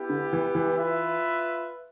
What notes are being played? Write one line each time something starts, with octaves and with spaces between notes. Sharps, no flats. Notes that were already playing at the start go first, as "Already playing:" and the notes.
Already playing: B3 E4 G4
D3
E3
E3
F4 B4 E5